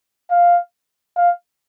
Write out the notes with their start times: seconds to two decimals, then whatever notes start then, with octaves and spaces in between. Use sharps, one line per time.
0.31 F5
1.17 F5